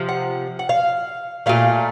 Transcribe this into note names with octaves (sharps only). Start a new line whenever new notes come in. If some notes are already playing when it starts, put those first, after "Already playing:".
Already playing: C3 F3
F#5
F#5
F5
A#2 F#3 A3 F5